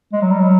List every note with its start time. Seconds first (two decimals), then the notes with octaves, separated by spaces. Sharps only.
0.13 G#3
0.22 F#3
0.31 G3
0.40 F#3